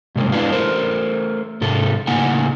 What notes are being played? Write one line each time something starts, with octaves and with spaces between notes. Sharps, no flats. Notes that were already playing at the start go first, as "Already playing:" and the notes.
G2 C3 G#3 A#3
G#3 D4 E4 B4 F5
A3 A#4 C5
G#2 C3 A4
A2 C#3 A#3 D#4 F#5 G#5